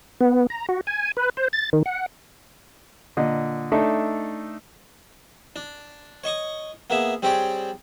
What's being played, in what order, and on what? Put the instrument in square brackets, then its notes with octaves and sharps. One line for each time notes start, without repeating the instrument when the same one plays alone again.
[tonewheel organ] B3
A#5
F#4
G#5
B4
C5
A6
D#3
F#5
[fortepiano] A#2 D3 D#5
A3 D4 D#4 A4 E5
[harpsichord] D4
C#5 D#5 C#6 D#6
A#3 B3 G#4 E5
G3 C4 G4 G#4 C#5 D5